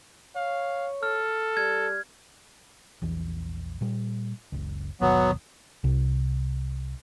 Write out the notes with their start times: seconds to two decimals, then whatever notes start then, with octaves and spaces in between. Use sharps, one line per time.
0.36 C#5 F5
1.03 A4 F6
1.57 G3 G#6
3.02 A#1 E2 E3
3.81 A#2 G3
4.52 F#1 C#2
5.01 G1 D#2 B2 F#3 B3
5.84 C2